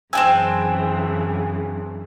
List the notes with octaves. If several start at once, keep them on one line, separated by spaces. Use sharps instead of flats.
F#2 C#3 E3 C4 D4 G5 G#5 E6